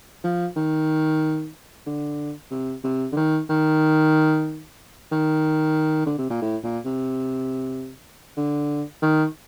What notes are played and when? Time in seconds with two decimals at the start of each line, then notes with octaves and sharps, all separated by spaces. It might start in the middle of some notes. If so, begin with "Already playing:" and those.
0.24 F3
0.56 D#3
1.86 D3
2.51 C3
2.84 C3
3.12 D3
3.17 D#3
3.49 D#3
5.12 D#3
6.06 D3
6.18 C3
6.30 A#2
6.42 A2
6.64 A#2
6.85 C3
8.37 D3
9.02 D#3